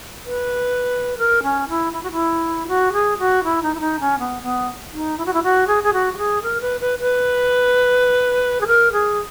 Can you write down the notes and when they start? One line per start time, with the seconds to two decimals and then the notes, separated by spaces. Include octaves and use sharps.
0.25 B4
1.18 A#4
1.43 C#4
1.69 E4
1.93 E4
2.03 F#4
2.12 E4
2.68 F#4
2.93 G#4
3.18 F#4
3.44 E4
3.63 D#4
3.75 E4
3.80 D#4
4.00 C#4
4.19 B3
4.43 B3
4.93 D#4
5.18 E4
5.26 F#4
5.33 E4
5.43 F#4
5.67 G#4
5.83 G#4
5.93 F#4
6.13 F#4
6.18 G#4
6.43 A#4
6.61 B4
6.81 B4
6.99 B4
8.61 G#4
8.67 A#4
8.92 G#4